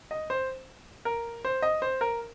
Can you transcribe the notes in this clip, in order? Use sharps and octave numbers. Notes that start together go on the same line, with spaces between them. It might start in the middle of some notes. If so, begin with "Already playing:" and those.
D#5
C5
A#4
C5
D#5
C5
A#4